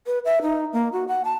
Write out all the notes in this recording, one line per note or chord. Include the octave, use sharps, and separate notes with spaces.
B4
E5
D#4
A#3
F#4
F#5
A5